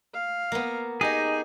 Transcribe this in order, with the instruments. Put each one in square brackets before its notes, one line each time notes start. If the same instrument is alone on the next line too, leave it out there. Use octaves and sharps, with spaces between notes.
[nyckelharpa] F5
[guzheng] A#3 B3
[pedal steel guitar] D#4 G#4 [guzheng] G4 D#5 [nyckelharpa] G#5